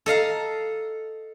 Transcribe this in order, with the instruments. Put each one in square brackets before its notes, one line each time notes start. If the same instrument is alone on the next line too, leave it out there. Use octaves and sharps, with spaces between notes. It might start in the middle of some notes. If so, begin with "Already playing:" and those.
[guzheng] A4 D#5 F5 A#5